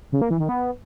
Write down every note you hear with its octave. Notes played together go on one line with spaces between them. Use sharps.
C#3
A#3
E3
D#3
B3